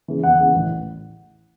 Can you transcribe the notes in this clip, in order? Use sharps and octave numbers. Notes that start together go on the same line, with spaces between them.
C#3 E3
E2 F#5
C#3 E3
A1